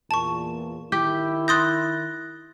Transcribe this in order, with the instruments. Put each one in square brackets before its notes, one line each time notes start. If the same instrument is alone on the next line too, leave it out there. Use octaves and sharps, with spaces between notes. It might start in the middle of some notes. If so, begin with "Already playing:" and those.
[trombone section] E2 A#2 [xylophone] A5 C#6
[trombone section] D#3 E4 [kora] G4 [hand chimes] G6
[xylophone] C6 D#6 G6 [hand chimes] F#6 A6 A#6